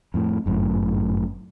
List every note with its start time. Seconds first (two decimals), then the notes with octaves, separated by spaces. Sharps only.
0.14 F2 A2
0.46 G1 F#2 A2